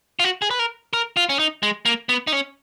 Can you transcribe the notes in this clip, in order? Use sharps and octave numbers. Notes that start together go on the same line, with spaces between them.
F4
F#4
G#4
B4
A#4
A#4
F4
C#4
D#4
G#3
A#3
B3
D#4
C#4